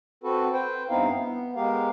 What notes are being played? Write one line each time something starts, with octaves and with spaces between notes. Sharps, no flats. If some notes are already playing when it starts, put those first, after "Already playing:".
C4 F#4 A4 B4
B4 C5 G5
G2 B3 C4 D#4 E4 F5
B3
G#3 B3 G4 A#4 F5